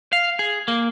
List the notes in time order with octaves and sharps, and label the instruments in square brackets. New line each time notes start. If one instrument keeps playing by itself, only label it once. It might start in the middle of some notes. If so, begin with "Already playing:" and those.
[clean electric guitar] F5
G#4
A#3